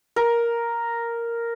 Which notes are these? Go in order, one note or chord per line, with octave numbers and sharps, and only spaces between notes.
A#4